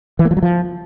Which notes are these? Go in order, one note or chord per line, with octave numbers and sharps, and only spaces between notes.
E3
A#3
F3
F#3
F3